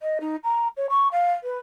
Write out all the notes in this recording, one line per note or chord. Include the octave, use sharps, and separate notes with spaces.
D#5
D#4
A#5
C#5
C#6
F5
B4